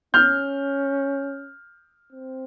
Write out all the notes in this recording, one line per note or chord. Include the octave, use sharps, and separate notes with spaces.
C#4 F6 G6
C4